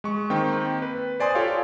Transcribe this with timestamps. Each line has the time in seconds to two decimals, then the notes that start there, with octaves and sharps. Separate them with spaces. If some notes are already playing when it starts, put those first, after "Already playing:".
0.04 G#3 C#6
0.30 D#3 A#3 C4 G5
0.82 B4
1.20 C5 D5 G#5 C6 D#6
1.35 F4 G4 A4 C#5 D5 F5